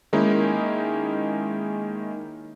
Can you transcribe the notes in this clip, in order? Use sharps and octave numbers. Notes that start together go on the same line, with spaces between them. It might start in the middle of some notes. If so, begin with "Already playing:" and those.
D#3 G#3 A#3 C#4 D#4 E4